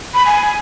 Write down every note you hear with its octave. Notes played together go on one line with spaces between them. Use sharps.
B5
G#5